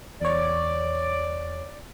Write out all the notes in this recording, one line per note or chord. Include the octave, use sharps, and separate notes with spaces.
E2 C#5 D5